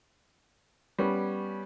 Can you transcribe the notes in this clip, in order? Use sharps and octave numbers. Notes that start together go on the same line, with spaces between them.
G3 B3 C#4